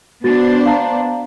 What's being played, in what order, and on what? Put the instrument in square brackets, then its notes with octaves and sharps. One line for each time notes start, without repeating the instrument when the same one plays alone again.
[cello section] B3 D4 C5 [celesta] F#4 A6
[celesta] F5 A5 A#5